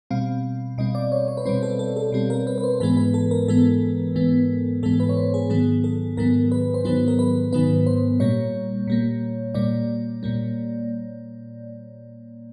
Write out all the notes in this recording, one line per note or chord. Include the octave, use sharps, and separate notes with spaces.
B2 G3 C4 F5
B2 G3 C4 D#5
D5
C#5
C#5
B4
B2 G3 C4 C5
A4
A4
A4
B2 G3 C4
A#4
B4
B4
C5
G#2 E3 G#3 B3 B4
B4
A4
A#4
G#2 E3 G#3 B3 A4
G#2 E3 G#3 B3
G#2 E3 G#3 B3 A4
B4
C#5
C5
G#4
G#2 D#3 F#3 B3 G#4
A4
G#2 D#3 F#3 B3 A#4
B4
C5
G#2 D#3 F#3 B3 B4
A#4
B4
G#2 D#3 F#3 B3 B4
C5
A#2 G3 A#3 C#5
A#2 G3 A#3
A#2 G3 A#3 D5
A#2 G3 A#3